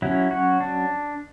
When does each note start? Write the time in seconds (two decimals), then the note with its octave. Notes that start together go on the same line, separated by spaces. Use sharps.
0.02 F#3 C#4 E4
0.31 F#4
0.60 D4